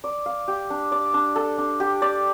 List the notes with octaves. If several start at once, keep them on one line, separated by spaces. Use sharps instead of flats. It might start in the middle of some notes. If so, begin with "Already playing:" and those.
D5
F5
G4
D4
D5
D4
A4
D4
G4
D5